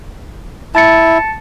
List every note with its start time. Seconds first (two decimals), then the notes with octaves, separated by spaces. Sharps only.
0.75 E4 A5 A6 C#7